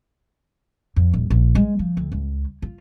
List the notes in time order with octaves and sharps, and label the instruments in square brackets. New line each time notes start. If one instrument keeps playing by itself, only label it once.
[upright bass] F2
D#1
A#1
G#3
F3
D2
C#2
F4